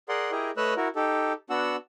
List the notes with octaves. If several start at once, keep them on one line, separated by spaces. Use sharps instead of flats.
G#4 A#4 D5 F#5 C6
E4 G4 G#4 A#4 D#5
A3 B4 C#5 D#5 E6 F#6
E4 F#4 A#4
D#4 G4 A4
B3 D4 F#4 F#5 E6